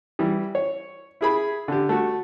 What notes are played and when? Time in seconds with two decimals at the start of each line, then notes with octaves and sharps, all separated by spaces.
0.19 E3 G3
0.55 C#5
1.21 E4 G#4 B5
1.68 D3 G4
1.89 A3 F#4